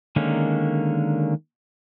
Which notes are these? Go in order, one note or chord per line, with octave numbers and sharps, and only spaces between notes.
D3 D#3 G#3 A#3 C#4